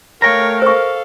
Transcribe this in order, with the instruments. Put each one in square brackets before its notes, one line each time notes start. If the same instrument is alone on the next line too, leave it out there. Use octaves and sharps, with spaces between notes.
[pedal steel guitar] A3 G5 A#5 [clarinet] A#4 [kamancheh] C#5 F5
[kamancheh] A4 F5 [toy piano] C5 C#6